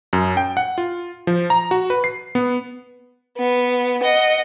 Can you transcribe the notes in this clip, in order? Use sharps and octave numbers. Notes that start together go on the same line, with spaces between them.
F#2
G5
F#5
F4
F3
A#5
F#4
B4
C7
B3
B3
D#5 F#5